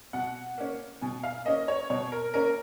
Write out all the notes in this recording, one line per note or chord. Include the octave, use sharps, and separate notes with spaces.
B2 F#5
A#3 C#4
B2 G#5
F5
A#3 C#4 D#5
C#5
B2 C#5
A#4
A#3 C#4 A#4